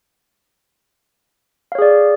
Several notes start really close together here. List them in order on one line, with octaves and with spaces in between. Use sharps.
F5 C#5 G#4 D5